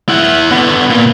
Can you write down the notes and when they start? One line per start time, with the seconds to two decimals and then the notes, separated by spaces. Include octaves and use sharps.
0.09 E4 F#5
0.51 D3 B3
0.90 A#2